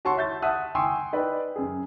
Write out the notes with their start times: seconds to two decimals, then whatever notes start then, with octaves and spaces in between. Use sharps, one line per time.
0.05 F#4 C#5 A5 C6 C#6
0.17 E5 G6 A6
0.42 E5 F#5 A5 D#6 F#6
0.75 G5 G#5 C6 C#6 D#6 E6
1.13 D#4 B4 D5 G5
1.56 F#2 G#4